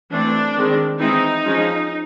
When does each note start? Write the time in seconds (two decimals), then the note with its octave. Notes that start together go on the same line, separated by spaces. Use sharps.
0.12 E3 A3 C4 D4
0.55 D#3 G#3 C4
0.99 E3 G#3 C4 D#4
1.44 F3 G#3 C#4